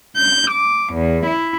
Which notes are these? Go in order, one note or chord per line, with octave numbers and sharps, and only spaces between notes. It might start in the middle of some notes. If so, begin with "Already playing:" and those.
G6
D6
E2
E4